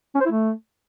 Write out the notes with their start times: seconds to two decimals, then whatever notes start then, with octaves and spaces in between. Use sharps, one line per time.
0.15 C#4
0.21 C5
0.26 E4
0.31 A3